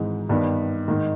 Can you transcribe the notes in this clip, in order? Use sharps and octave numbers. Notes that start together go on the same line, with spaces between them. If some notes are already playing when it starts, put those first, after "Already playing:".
Already playing: G#1 G#2 E3 G#3 D#4
G2 D#3 G3 B3
G#2 D#3